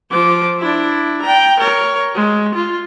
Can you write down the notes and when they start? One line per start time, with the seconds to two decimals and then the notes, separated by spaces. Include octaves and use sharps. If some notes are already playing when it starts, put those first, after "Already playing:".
0.11 F3 D6
0.59 D4 E4
1.22 G5 A#5
1.60 A#4 C#5
2.15 G#3
2.55 F4